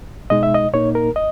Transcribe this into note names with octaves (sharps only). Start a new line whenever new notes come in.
B2 G#3 D#4 D#5
E5
D#5
A#2 A#3 D#4 C#5
A#4
D#5